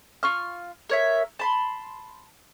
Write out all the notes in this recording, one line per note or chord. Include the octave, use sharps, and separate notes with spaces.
F4 C#6 F6
A#4 C#5 E5
A5 B5 C6